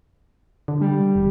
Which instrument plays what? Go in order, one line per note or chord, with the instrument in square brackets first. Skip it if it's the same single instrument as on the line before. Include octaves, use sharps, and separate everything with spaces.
[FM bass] D3
[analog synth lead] G3
[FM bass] E1